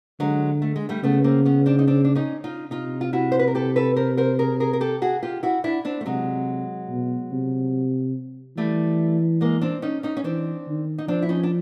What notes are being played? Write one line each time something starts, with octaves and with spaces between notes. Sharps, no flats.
D3 F#3 G#3
A3
G#3
G3 A3
C#3 A3 B3
A#3 C4
B3 C#4
C4 D4
D#4
C4 D4
D4
C#4 D#4
D#4 F4
C3 D#4 F4
F4
E4 F#4
C5
B4
A#4
G4 A4
A4 B4
A#4 C5
A#4 C5
G#4 A#4
G#4 A#4
A#4
G4 A4
F#4 G#4
F4 G4
E4 F#4
D4 E4
C4 D4
A3
C3 F#3 G#3
B2
C3
E3 G3 A3
G#3 A#3
C4 D4
C#4 D#4
C#4 D#4
C#4
E3 C4 D4
D#3
D#4
F3 C4 D4
E4
C#4 D#4
D4